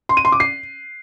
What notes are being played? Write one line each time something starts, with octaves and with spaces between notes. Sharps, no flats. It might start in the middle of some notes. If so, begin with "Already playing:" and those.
C6
D#7
C6
D6
C7